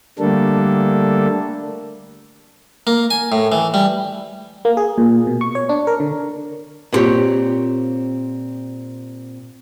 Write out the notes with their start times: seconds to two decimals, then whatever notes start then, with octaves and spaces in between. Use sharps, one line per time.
0.19 D3 G3 A3 A#3 D4 A4
2.87 A#3
3.10 G#5
3.32 A2
3.52 E3
3.74 G3
4.65 A#3
4.77 G#4
4.98 A#2
5.27 B2
5.41 C#6
5.55 C#5
5.69 D4
5.87 A#4
6.00 D3
6.92 A#2 B3 C4 F4 G4 C#5